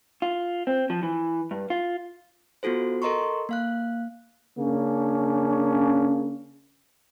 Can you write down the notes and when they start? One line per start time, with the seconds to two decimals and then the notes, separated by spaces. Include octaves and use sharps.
0.22 F4
0.67 C4
0.90 F3
1.03 E3
1.51 G2
1.70 F4
2.63 B3 F4 F#4 A4 C5
3.02 A4 A#4 D#5 A#5 C6 C#6
3.49 A#3 F5 F#6
4.59 C#3 A#3 C#4 D4